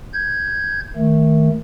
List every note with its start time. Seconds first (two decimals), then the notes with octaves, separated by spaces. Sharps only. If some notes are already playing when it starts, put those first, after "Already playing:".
0.14 G6 G#6
0.96 D#3 A3